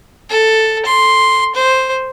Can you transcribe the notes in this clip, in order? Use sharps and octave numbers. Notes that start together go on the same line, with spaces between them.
A4
C6
C5